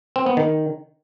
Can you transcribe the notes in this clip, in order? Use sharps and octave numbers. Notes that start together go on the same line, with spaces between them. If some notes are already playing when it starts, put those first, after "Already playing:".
C4
B3
D#3